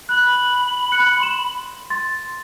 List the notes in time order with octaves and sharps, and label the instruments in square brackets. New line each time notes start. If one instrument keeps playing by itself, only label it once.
[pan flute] B5 [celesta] F#6
[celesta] F#6 C#7
C6 E7
C6 A6